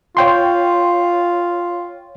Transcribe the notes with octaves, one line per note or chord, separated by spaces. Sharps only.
F4 C#5 G5 C6